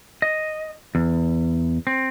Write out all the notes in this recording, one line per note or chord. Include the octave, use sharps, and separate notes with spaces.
D#5
E2
C4